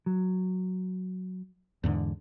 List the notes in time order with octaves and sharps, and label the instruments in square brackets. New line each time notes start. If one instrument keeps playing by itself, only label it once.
[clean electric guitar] F#3
[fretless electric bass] E2 G#2 D3